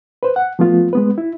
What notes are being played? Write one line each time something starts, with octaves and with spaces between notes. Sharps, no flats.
B4 C5
F#5
F3 A3 B3 F4
G#3 B3 B4
E4